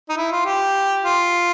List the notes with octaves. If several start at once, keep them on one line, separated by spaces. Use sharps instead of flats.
D#4
E4
F4
G4
F4